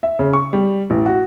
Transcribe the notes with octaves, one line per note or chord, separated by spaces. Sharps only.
E5
C#3
C#6
G3
A1
F#4